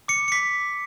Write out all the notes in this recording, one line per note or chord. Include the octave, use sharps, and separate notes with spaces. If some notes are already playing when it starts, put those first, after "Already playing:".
D6 C#7
C#7
D6 B6